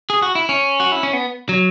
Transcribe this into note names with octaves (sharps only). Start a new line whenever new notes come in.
G#4
F#4
E4
C#4
F#4
E4
C#4
B3
F#3